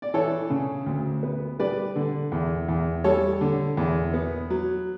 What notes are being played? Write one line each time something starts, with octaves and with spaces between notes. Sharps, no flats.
D5
E3 A4 C#5
C#3
D2
B3
G3 B4 D5
D3
E2
E2
G3 A4 C#5
D3
E2
B3
F#3